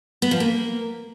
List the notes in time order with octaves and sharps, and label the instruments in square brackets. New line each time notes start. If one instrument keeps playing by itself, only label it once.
[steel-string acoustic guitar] B3
F3
A#3